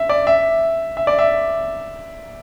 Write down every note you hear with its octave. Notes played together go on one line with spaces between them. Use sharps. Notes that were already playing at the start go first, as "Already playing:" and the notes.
Already playing: E5
D5
E5
E5
D5
E5